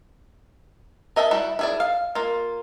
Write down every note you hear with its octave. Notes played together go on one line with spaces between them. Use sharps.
A#4 D#5 E5 F#5 A5
G3 E4 F#4
E4 G#4 D5
F5
A#3 F4